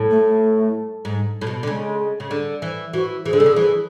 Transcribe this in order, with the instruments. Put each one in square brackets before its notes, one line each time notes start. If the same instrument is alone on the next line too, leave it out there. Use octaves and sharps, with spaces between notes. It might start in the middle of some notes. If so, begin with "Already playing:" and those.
Already playing: [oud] A2
[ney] A3
A3
[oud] G#2
A2
B2
D3
[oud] C#3 [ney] G#3
[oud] C#3
D3
E3
[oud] E3 [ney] F#4
[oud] E3 [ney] G#4
[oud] D3
[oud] C#3 [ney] A4
[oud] D3
[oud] E3 [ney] G#4